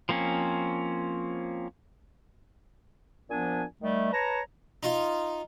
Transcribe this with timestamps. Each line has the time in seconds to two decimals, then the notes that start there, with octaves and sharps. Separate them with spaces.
0.09 F3 A#3 C4 C#4
3.29 A#2 F3 B3 D4 G#5
3.80 D#3 G3 A3
4.12 B4 C#5 A5 A#5
4.83 D#4 F4